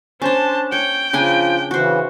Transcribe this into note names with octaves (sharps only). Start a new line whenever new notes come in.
C#4 D4 C5 A5
C#5 G5
C#3 F3 D4 G#5
C#3 E3 F#4 C5